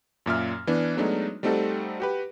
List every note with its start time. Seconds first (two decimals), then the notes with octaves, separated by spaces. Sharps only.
0.26 F#2 A#2 E5 F6
0.67 E3 B3 D4
0.97 F#3 G#3 A3 B3 D4 D#4
1.43 G3 A3 C4 D#4 F#4 A4
2.00 F#4 G4 B4